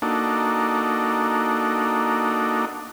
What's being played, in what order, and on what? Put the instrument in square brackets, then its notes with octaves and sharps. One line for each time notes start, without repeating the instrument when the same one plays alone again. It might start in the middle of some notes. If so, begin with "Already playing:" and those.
[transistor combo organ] A#3 D4 D#4 F#4 A4